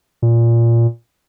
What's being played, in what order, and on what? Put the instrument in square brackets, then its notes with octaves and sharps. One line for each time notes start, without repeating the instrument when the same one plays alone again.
[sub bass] A#2